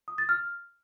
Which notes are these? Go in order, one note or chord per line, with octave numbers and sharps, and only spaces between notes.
D#6
A6
F6